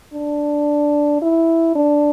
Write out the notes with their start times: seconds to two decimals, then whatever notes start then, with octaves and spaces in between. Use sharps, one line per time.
0.13 D4
1.22 E4
1.75 D4